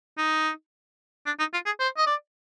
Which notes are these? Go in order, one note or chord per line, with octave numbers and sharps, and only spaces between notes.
D#4
D4
D#4
F4
G#4
C5
D#5
D5